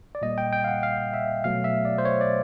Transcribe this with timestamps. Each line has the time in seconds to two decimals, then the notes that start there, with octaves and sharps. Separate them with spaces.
0.15 D5
0.22 A#2 G3 A#3 D#5
0.38 G5
0.53 G5
0.64 F5
0.68 F#5
0.83 F5
1.14 E5
1.44 B2 F#3 A3 F5
1.64 E5
1.85 D5
1.98 C5
2.05 C#5
2.21 D5